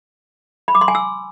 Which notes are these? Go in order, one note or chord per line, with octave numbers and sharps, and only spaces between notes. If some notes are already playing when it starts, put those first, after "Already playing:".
B5
D6
C6
G#5
E6